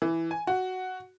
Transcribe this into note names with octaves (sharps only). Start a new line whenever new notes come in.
E3
G#5
F#4